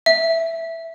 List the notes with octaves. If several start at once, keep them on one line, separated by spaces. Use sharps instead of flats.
E5